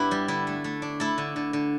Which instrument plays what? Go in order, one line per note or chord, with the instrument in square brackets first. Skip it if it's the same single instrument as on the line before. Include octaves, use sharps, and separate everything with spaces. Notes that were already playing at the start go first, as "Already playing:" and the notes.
Already playing: [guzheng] G2 B3 D4 E4 G4 B4
G3
D3 E4
A3
A3
D4
A3 E4 A4
D3
D3
D3